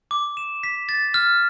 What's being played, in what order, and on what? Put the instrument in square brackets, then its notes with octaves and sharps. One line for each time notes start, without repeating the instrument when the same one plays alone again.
[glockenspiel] D6
E7
B6
A6
F6